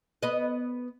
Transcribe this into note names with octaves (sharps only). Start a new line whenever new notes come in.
B3 D#5